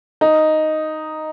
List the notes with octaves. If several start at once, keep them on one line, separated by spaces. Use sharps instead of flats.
D#4